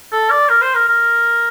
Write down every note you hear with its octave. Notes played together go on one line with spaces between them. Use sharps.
A4
D5
A#4
C5
A#4
A#4